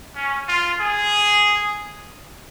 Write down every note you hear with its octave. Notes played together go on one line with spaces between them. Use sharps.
C#4
F4
G#4